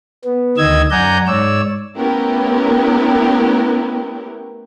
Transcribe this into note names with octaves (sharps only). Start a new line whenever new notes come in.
B3
D2 D#3 D#5 E6 G#6
F#2 D5 F#5 G#5 A#5 G6
G#2 C#5 D5 E6
A3 B3 C#4 E4 G4 A#4